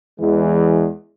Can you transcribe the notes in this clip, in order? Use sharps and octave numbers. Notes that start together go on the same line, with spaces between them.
E2 E3 G#3